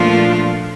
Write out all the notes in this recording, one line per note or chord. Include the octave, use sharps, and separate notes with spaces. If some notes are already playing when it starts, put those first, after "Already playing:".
Already playing: A#2 F3 A3 D4 F4